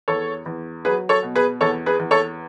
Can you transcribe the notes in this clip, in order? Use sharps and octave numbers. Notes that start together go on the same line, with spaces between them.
E2 A4 C#5
E2
F#3 G#4 B4
A4 C#5
B2
G#4 B4
E2 A4 C#5
G#4 B4
E2
A4 C#5